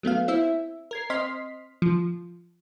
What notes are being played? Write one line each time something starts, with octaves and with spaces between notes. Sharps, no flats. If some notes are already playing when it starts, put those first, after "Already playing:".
F#3 A3 B3 F5
C4 E4 E5
A#4 G#6 C7
C4 D#5 C6 F6 B6 C7
F3